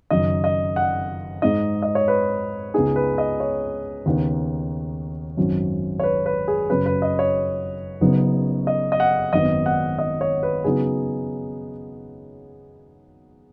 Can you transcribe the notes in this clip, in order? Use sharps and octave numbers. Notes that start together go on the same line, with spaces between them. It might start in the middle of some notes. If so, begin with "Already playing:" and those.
F#1 F#2 D#3 D#5
D#5
F#5
G#2 G#3 D#4 D#5
D#5
C#5
B4
C#2 C#3 B3 D#4 G#4
B4
D#5
C#5
D#2 C#3 B3 D#4
G#1 F#2 F#3 C#4
C#5
B4
B4
G#4
F#1 F#2 F#3 C#4 B4
B4
D#5
C#5
F#1 F#2 C#3 B3 D#4
D#5
D#5
F#5
G#1 F#2 D#3 B3 D#5
F#5
D#5
C#5
B4
C#3 F#3 B3 D#4 G#4